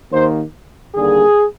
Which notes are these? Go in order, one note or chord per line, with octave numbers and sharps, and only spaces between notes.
D#2 D#3 A#3 C5
D#2 D3 G3 A#3 G#4